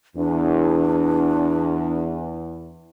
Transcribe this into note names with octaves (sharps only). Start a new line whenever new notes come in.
E2 D4